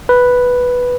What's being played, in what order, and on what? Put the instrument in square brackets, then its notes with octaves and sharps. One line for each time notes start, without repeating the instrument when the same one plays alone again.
[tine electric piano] B4